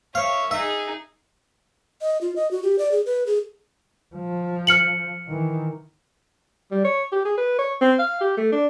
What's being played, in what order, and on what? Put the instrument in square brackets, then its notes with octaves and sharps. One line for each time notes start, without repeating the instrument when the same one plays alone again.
[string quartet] C#5 E5 [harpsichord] F5
[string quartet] D#4 G#4 [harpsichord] E5
[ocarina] D#5
F4
D#5
F#4
G4
D5
G#4
B4
G#4
[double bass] F3
[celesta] F6 C#7 F#7
[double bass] D#3 E3
[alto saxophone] G3
C#5
G4
G#4
B4
C#5
C4
F5
G4
A3
D4